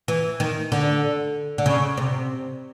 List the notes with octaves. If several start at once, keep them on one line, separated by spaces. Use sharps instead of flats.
E3
D#3
D3
D3
C#3
C3